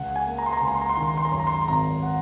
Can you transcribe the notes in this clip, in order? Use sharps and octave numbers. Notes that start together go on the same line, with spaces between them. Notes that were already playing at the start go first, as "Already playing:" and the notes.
Already playing: C#2 F#5
G#5
A#3
A#5
C6
A#5
C#2 C6
A#5
C6
A#5
C6
D#3 A#5
C6
A#5
C6
A#5
F#2 C6
A#5
C6
A#5
C6
G#1 A#5
F#5